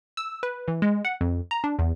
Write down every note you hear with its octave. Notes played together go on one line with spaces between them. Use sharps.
E6
B4
E3
G#3
F#5
F2
A#5
D4
E2